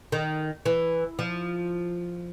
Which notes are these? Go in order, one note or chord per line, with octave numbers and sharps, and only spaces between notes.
D#3
E3
F3